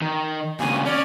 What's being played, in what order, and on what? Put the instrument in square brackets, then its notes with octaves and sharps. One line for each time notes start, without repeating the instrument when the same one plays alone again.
[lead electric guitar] D#3
[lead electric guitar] D#2 C#3 [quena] G#5
[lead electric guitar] C#4 [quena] D5